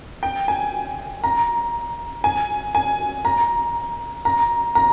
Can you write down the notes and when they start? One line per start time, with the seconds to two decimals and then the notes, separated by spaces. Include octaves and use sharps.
0.23 G5
0.48 G#5
1.24 A#5
2.24 G#5
2.75 G#5
3.25 A#5
4.25 A#5
4.75 A#5